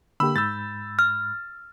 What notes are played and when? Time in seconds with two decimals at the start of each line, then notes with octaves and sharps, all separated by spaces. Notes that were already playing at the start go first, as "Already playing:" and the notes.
0.20 D3 A#3 G4 B5 E6
0.36 G#2 B5 E6 G6 A6
0.99 F6